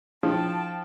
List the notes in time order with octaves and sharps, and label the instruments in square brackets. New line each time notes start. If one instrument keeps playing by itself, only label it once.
[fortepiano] F3 [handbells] D4 G#4 [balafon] E4 [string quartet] G5 A5